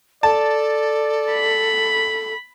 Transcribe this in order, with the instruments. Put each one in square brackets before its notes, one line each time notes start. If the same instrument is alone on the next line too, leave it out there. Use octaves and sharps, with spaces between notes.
[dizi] A4 [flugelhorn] D5 [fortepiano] A5
[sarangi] B5